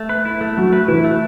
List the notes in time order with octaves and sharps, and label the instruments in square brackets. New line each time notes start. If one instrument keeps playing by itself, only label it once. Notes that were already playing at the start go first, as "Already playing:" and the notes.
Already playing: [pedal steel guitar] A3
B4
E4
A3
[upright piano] F#3 [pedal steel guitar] A3
[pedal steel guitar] B4
[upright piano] E3 [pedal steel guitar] E4
[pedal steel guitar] A3